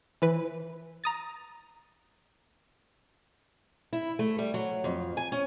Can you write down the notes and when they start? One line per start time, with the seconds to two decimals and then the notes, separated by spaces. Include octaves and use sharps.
0.22 E3 B4
1.04 A#5 D#6 A6
3.93 E4
4.19 A3
4.38 G3
4.54 F#3
4.84 F2
5.17 G#5
5.32 C#4